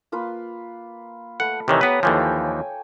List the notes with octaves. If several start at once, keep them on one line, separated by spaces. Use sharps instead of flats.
A#3 F4 B4
A3 B4 F#5
C3 D#3 E3 G4 C#5
B3 B4 G5 A5 A#5
D#2 E3 F3 A4 G5 G#5